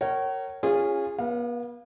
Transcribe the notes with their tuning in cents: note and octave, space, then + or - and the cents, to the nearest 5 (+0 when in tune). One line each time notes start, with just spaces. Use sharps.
A#4 -15 C#5 -10 F#5 +45
C#4 +0 F4 +0 G#4 -25
B3 -40 F5 +0